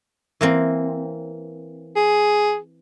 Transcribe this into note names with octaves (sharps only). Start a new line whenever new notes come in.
E3 A#3 C4
G#4